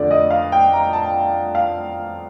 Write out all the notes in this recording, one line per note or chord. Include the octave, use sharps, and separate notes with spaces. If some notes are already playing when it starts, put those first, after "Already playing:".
Already playing: F2 D3 A3 D5
D#5
F5
G5
A#5
A5
F5